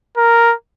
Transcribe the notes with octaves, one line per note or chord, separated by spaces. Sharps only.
A#4